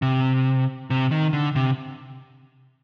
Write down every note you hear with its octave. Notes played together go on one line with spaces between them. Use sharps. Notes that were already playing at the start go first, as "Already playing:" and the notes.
C3
C3
D#3
D3
C3